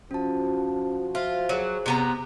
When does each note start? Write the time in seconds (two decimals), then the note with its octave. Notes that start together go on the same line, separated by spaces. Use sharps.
0.11 F3 C#4 F#4 A5
1.15 F4 C5 E5 F5
1.49 F#3 G#4 C5
1.86 C3 B3 A#5